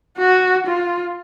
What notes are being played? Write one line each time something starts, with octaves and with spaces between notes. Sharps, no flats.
F#4
F4